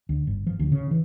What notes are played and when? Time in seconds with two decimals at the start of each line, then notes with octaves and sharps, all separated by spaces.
0.09 D2
0.27 G1
0.47 F3
0.59 D2
0.72 C#3
0.91 E3